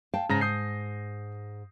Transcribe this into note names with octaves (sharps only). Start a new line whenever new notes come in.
F5 G5 A5
G#2 C#3 A#5 A#6
D#6 G6 C7